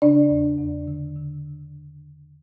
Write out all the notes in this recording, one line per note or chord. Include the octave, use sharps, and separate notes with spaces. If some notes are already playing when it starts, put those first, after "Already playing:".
C#3 D4 D5
E2
E2
D3
D3